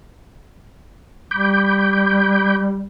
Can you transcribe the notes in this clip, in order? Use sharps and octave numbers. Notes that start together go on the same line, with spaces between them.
G3 B5 D6 G6